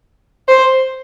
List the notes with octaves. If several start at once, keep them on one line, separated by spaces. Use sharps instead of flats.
C5